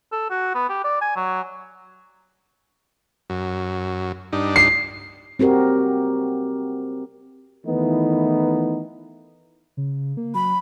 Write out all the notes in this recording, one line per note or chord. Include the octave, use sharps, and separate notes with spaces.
A4
F#4
B3
G4
D5
G#5
F#3
F#2
G2 D4 D#4
C7
C4 F#4 G4 A#4
D#3 E3 A3 B3 D#4 E4
C#3
A#3
F#3 B5